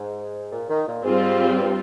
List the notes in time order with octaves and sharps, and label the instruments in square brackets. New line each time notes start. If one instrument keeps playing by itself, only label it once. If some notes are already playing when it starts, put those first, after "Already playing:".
Already playing: [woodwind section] G#2
A#2
D#3
A#2
[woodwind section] G#2 [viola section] G3 C4 F4
[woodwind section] G2